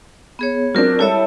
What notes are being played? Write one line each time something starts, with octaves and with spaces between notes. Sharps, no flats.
B3 G#4 C#5
F#3 C4 D4 F4 A#4
G3 E4 A4 C#5 E5 A5